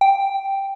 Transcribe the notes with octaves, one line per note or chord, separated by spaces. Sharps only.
G5